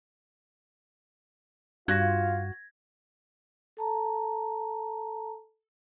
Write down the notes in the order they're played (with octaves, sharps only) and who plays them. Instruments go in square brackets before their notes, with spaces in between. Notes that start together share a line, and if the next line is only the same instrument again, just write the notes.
[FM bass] G2 [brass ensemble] F4 F5 [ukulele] F#4 [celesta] G#6 A#6
[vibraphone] A4 A5 A#5